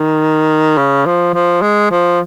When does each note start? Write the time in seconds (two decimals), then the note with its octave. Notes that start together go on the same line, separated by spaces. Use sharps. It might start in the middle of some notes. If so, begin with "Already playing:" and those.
Already playing: D#3
0.78 C#3
1.06 F3
1.34 F3
1.62 G#3
1.91 F3